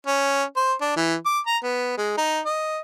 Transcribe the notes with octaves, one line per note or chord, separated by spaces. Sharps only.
C#4
C5
D4
E3
D6
A#5
B3
G#3
D#4
D#5